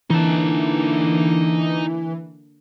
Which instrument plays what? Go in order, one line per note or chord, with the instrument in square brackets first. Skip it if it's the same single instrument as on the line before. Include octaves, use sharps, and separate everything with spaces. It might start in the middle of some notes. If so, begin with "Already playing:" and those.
[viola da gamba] D3 A#3 [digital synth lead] E3 [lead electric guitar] D#4 A5